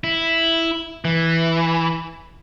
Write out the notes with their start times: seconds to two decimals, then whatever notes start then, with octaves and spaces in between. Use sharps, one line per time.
0.04 E4
1.05 E3